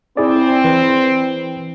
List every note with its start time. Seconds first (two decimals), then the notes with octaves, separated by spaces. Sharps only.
0.17 C4 E4 G#4 D5
0.64 E3 B4